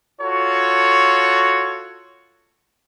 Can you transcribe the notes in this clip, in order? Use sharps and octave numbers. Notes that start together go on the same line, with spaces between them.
F4 F#4 A4 C#5